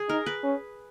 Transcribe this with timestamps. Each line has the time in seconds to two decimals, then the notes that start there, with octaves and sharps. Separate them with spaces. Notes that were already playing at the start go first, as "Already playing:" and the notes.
Already playing: G#4
0.09 D#4 A#4
0.26 B4
0.44 C#4